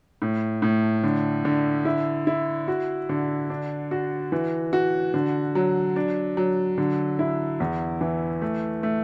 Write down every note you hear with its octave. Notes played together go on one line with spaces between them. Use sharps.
A2
A2
D3
D3
E4
E4
F#4
D3
D4
F#4
E3
F#4
D3
F#3
D4
F#3
D3
E4
E2
E3
A3
A3